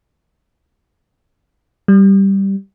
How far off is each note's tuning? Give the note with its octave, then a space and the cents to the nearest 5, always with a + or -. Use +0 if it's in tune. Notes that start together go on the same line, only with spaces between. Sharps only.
G3 -5